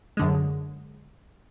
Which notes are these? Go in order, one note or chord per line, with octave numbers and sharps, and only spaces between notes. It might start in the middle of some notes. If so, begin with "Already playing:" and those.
F#2 D3 G#3